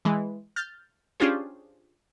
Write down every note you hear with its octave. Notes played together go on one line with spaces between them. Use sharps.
E3 G#3
F6 G6 A6
C#4 D4 F4 G4 G#4 C5